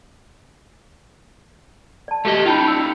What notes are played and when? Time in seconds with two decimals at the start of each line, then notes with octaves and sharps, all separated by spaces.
2.08 D5 A5
2.25 A3 G4 D5 D#5
2.46 D#4 F4 G5 A5 B5
2.68 D5 E6